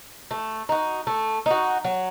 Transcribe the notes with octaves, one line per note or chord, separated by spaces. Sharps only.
A3
D#4 F#4
A3
D#4 F#4
F#3